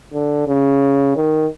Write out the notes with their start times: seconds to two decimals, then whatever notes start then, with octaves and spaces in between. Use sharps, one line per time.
0.14 D3
0.48 C#3
1.16 D#3